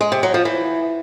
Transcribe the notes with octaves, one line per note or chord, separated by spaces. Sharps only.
G#3
C3
F#3
F3
E3